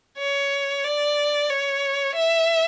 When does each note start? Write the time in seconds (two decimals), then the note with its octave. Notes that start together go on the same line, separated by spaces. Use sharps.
0.18 C#5
0.84 D5
1.50 C#5
2.16 E5